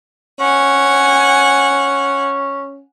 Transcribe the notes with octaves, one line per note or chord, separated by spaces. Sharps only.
C#4 F#5 G#5